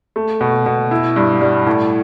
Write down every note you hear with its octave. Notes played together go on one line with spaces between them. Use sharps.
A3
B2
B2
E4
G2
G3
A2